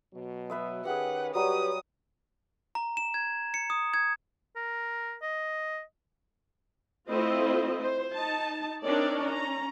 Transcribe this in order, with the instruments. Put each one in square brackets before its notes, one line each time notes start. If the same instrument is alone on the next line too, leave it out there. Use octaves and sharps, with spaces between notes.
[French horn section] B2 F#3
[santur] B4 E5 D#6
[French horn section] D#3 C#4 B4 [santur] G4 G#4 [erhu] F#5
[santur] F#3 G3 C#5 [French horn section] G4 B4 [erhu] D#6
[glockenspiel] A#5
E7
G#6
C#7
D#6
G#6
[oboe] A#4
D#5
[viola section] A3 C4 E4 F4 C5 D#5
C5
D#4 A5
C4 D4 D#4 A#4 C#5 D5
C#4 A#5